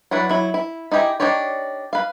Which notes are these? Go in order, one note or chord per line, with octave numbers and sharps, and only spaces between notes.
F#3 D4 E4 F#4 B4
F#3 E4
E4
D#4 E4 G4 G#4 E5
D4 D#4 G4 C#5 D5
B4 F5